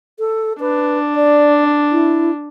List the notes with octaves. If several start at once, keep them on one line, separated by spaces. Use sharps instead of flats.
A4
D4 B4
D5
E4